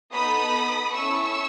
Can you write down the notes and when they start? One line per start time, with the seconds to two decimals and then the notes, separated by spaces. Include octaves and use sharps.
0.14 B3 D#4 A4 B5 D#6
0.96 C#4 E4 A4 C#6 E6